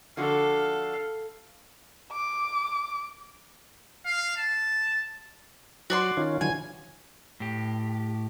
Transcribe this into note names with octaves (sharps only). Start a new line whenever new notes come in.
D3 F3 F#4 A4 F5
D6
F5
A5
F#3 F#4 D5 C6
D#3 C#4 F4
D3 E3 F#3 G#5
A2 G4